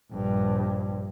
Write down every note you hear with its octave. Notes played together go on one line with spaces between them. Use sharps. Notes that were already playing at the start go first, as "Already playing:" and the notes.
A#1 G2